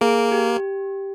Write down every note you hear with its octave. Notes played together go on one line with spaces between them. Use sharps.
A#3 G#4
G4